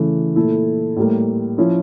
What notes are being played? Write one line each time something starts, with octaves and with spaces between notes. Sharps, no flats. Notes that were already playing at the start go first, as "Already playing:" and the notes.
Already playing: C#3 E3 A3
A#2 A3 E4 A4
A2 G3 A#3
F3 C#4 E4